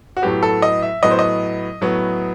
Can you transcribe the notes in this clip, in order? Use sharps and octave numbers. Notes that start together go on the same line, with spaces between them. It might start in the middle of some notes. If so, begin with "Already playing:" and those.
F#4
A2 F#3 B3 G4
A4
D#5
E5
A2 F#3 B3 D#5
C5
D#5
A2 F#3 B3